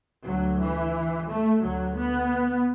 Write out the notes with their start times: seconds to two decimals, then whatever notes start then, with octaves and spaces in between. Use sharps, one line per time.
0.24 D2 F#3
0.59 E3
1.26 A3
1.61 D2 F#3
1.96 B3